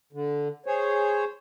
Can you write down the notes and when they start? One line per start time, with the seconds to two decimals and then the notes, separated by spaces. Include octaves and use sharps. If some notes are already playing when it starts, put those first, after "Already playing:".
0.13 D3
0.66 G#4 C5 C#5